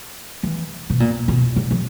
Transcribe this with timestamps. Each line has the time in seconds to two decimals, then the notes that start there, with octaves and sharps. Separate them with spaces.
0.43 E3
0.90 B2
1.00 A#2
1.28 B2
1.56 C3
1.71 F3